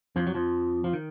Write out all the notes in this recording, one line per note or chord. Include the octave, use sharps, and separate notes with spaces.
F2 F3
F#3
F2 F3
F3
D#3